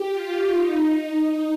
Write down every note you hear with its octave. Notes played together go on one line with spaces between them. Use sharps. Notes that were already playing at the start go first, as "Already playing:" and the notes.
Already playing: G4
F4
D#4